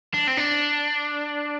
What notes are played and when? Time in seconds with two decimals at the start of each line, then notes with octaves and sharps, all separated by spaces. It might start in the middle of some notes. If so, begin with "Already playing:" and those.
0.14 D4
0.28 C4
0.37 D4